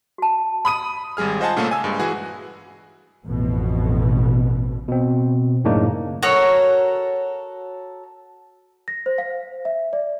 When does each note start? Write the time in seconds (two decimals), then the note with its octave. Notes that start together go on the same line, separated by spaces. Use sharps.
0.18 F#4 A5
0.65 B5 D#6 D#7
1.17 G#1 G3 G#3 G#4 F6
1.40 F4 C5 D#5 F#5 G#5 A5
1.56 A#2 C#3 A3 A#3 C#4 A4
1.71 G#5 E6
1.84 G2 G#3
1.99 E3 F#4 G#4
3.25 A1 F2 B2
4.88 B2 C4
5.64 F#2 A2 C#3 A#3 D4 D#4
6.23 F#4 A4 A#4 C#5
8.88 A#6
9.06 C5
9.18 F5
9.65 E5
9.93 D5